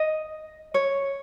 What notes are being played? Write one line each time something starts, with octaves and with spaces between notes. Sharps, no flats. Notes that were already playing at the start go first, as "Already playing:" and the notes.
Already playing: D#5
C#5